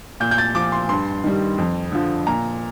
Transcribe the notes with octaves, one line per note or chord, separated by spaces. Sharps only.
A#2 G6
G6
A6
F3 D6
C6
G2 C6
D#3 G3
F2
D3 F3
A#2 A#5